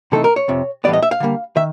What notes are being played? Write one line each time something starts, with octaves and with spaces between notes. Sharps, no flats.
C3 E3 A3 C4 D#4 A4
A#4
C#5
F2 C3 F3
A2 E3 G3 B3 D5
D#5
E5
F5
D3 G3 A#3
D#3 E5